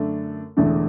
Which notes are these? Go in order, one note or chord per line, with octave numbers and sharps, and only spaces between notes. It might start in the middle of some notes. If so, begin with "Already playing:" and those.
Already playing: F#2 D3 A3 D4
E1 E2 D3 A3 D4